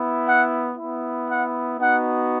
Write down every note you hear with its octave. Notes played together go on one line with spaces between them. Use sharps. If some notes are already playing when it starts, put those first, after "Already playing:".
Already playing: B3 E4
F#5
E4
B3
F#5
B3 D#4 F#4 F#5